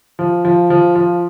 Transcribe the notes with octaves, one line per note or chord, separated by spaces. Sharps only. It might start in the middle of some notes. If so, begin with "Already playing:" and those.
F3
F3
F3
F3